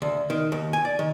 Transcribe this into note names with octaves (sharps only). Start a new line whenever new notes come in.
D2
D#3
D#2
G#5
D5
D#3